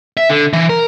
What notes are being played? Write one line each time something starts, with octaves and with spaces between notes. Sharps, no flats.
E5
D3
E3
A#4